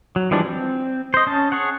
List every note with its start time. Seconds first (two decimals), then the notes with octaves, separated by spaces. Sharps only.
0.16 F#3
0.31 E3 F3 G3 G#3 D4
0.44 C4
1.14 C5 D#5
1.27 C#4 A5
1.52 G#4 C#5 F#5